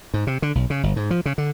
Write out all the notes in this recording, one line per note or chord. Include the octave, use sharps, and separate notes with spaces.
G#2
C3
D3
B1
C#3
G1
G#2
F3
C#3
D3